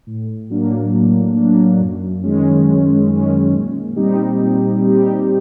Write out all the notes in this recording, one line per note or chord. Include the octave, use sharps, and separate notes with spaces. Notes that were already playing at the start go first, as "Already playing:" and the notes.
A2
F#3 A#3 D4
A2
F#3 A#3 D4
F#2
D#3 G#3 C#4
F#2
D#3 G#3 C#4
A#2
G3 C4 D#4 G4
A#2
G3 C4 D#4 G4